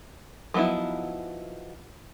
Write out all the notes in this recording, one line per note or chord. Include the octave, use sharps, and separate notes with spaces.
F3 F#3 B3 D#4 E4